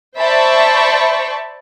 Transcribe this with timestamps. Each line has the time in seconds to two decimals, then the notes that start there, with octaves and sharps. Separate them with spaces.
0.17 C5 D5 E5 A5 B5 C#6